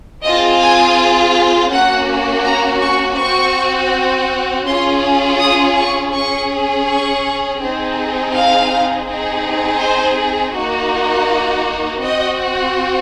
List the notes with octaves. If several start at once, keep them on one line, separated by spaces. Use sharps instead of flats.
C4 F4 G#4 D#5
G#5
A#3 C#4 F#4 F#5
A#5
C#6
C4 F#4 C#6
C#4 F4 G#4 C6
D#6
C#6
C#4 G#4 C#6
C#6
C4 D#4 G#4
F5
C4 D#4 G#4
C5
A#3 D#4 F#4
C4 F#4 D#5